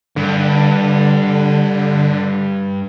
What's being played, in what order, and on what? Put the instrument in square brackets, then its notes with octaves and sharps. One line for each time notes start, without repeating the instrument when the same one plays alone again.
[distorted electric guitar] G2 [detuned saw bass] D3